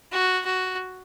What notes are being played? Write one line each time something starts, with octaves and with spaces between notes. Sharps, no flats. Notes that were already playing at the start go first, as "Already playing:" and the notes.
F#4
F#4